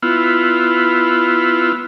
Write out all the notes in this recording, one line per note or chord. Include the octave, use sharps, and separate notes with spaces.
B3 E4 F4